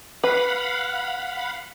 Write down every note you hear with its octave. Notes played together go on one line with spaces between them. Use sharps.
B4 F5 F#5 B5